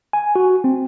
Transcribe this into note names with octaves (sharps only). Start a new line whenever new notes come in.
G#5
F#4
C4